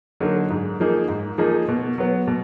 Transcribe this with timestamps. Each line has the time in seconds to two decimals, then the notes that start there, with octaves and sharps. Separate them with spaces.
0.20 D3 F#3 A#3 D#4
0.50 G#2
0.80 F3 A#3 D#4 G#4
1.08 G#2
1.38 F3 A#3 D#4 G#4
1.68 B2
1.98 F#3 B3
2.27 B2